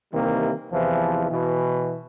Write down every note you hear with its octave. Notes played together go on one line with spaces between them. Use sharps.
C3 D#3 E3 G3 A#3
E2 C3 E3 F3
B2 E3